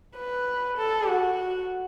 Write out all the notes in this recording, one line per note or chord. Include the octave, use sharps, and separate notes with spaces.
B4
A4
F#4